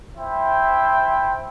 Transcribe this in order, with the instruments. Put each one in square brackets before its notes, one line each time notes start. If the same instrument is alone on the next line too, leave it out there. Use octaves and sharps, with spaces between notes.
[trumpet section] E4 C5 E5 G5